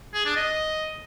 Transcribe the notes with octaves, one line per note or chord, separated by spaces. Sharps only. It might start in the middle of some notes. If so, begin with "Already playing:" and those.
G#4
D4
D#5